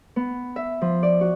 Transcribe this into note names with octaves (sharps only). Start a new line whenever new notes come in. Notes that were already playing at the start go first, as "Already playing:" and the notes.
B3
E5
F3
D5
F#4